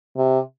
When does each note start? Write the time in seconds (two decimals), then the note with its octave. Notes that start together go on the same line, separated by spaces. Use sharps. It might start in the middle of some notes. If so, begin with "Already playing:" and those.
0.17 C3